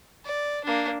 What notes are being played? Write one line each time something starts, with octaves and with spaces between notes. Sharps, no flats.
D5
A#3 D4